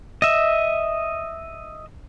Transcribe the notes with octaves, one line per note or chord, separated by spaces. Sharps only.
D#5 E5